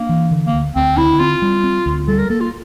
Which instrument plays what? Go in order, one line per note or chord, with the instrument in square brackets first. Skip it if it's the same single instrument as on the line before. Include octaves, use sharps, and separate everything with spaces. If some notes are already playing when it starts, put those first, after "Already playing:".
Already playing: [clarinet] A#3 [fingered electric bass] D4
[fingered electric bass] E3
D3
[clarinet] A#3
[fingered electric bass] D2
[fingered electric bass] D2 [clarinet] C4
[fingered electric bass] D3 [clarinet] E4
[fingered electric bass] C4 [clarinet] F4
[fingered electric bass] G3
C4
D2
[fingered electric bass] G3 [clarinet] A4
[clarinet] A#4
[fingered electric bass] A#3 [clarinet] A4
[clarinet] F4